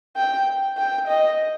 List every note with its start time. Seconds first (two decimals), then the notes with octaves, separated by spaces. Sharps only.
0.16 G5
0.77 G5
1.08 D#5